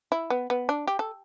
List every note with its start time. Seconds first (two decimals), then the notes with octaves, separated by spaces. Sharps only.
0.12 E4
0.30 B3
0.50 B3
0.69 D4
0.87 G4
0.99 A4